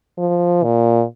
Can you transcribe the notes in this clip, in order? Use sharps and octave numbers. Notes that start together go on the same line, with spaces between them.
F3
A#2